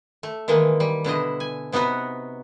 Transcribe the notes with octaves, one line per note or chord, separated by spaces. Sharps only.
A3
D#3 E3 G#3 A#3
G3
B2 D3 E4 D#5
G#5
C3 B3 D#4 F#4 B4